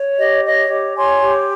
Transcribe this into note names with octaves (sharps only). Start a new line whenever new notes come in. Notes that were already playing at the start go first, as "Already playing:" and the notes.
Already playing: C#5
G4 D#5
C#5 D#5
G4
C#5 G#5 C6
G4